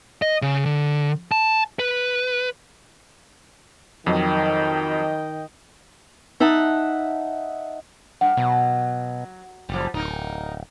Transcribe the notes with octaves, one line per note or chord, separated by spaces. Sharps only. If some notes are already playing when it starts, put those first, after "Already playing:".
D#5
C#3
D3
A5
B4
F2 D#3 F#3 D#5 G5
D#4 E5 F#5 A5
G2 F#5
B2 F#3
F#1 F3 G3
D1 D#4 A#4